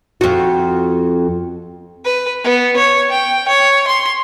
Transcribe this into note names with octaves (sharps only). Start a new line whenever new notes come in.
F2 F#4
B4
B3
C#5
G5
C#5
C6